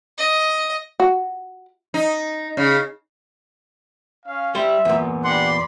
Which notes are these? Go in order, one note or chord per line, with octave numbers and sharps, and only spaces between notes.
D#5
F#4
D#4
C#3
C#4 F5
G3 C5 E5
E2 A#2
D4 G4 D5 F#5 B5 C6